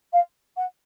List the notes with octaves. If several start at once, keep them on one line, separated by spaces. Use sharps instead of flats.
F5
F#5